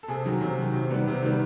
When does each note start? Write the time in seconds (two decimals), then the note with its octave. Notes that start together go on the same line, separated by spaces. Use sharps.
0.03 A4
0.08 C3 G#4
0.25 D#3 F#3
0.41 C3
0.58 D#3 F#3
0.74 C3
0.90 D#3 G3 B3
1.07 C3
1.22 D#3 G3 B3